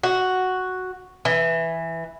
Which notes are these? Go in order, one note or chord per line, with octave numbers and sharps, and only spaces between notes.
F#4
E3